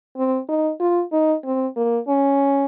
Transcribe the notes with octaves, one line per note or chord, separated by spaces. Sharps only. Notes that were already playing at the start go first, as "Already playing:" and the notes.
C4
D#4
F4
D#4
C4
A#3
C#4